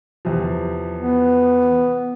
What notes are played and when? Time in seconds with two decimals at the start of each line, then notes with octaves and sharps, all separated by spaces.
0.25 E2 C3 F3
0.99 B3